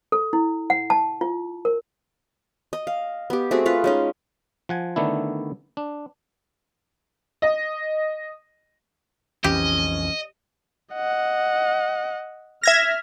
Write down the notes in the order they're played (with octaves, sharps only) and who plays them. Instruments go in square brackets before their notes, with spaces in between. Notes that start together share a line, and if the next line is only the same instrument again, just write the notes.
[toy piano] A4
E4
F#5
A5
F4
A#4
[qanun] D#5
F5
B3 G4
A3 C4 F#4 G#4
F4 B4 F5
G#3 C#4 D#4
[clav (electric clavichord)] F3 F#5 G#5
D3 D#3 A3 B3 D4 E4
D4
[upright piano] D#5
[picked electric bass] B1 F2 E3 [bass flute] C#4 [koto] G4 [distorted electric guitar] D#5
[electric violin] D#5 F#5
[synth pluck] E5 G#6 A#6 [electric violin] F6